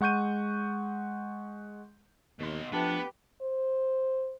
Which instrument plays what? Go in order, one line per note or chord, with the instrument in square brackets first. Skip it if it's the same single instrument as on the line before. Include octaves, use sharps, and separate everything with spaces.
[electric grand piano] G#3 F#5 C#6 G6 D#7
[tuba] D#2 [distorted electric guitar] B2 C6
[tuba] F3 [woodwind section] A3 D4 [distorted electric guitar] B3 [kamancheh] G4 B4
[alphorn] C5